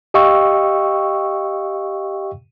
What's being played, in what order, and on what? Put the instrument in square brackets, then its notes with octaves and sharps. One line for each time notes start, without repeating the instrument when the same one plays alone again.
[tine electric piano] G4 D#5 F5 G5 C#6 E6